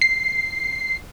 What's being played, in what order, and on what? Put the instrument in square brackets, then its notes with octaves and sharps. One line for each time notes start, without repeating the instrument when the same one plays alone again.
[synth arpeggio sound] C7